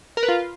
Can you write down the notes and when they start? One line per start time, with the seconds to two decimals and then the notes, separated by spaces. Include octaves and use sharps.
0.17 A#4
0.23 B4
0.28 F4